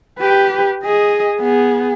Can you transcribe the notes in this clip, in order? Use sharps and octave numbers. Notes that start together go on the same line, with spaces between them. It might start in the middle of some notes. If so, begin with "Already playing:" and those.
G4 B4
G#4 D#5
B3 G#4